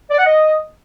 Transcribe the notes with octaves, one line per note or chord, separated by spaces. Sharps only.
D5
F#5
D#5